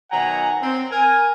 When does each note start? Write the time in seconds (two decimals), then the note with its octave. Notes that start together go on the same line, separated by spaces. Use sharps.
0.11 B2 D#3 F#3 F#5 G#5 A#5
0.62 C4
0.91 A#4 G#5